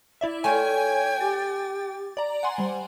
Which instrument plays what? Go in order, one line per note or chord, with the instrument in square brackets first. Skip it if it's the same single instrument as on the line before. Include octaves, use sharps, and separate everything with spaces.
[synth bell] E4 D5 E5
[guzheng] A3 F4 [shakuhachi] C#5 [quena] G5 [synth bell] G#5 G#6
[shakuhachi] G4 [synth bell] A6
[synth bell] D5 A#5
F#5 G#5 C6
[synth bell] G3 [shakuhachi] C5